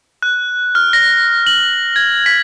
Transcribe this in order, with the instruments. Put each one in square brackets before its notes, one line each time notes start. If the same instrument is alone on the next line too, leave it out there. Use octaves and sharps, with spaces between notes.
[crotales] F#6
F6
A#6
F#7
G#6
B6